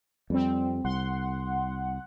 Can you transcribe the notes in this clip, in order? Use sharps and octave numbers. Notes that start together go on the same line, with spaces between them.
F2 G3 C4
C2 F#5 C6